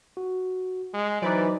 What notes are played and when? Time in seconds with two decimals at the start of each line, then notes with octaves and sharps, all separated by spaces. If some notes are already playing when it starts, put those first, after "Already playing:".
0.17 F#4
0.94 G#3
1.22 E3 F#3 D#4 B4 C5 D5